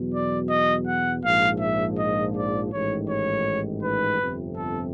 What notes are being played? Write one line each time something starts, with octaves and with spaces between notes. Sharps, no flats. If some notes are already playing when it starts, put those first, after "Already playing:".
Already playing: E2 B2 F#3
D5
D#5
F#5
A#1 G#2 F3 F5
E5
D#5
D5
A1 G#2 D#3 C#5
C#5
B4
G1 F2 C3
A4